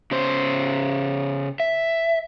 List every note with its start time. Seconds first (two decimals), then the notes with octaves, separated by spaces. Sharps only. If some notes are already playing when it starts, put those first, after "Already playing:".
0.11 C#3 C5
1.60 E5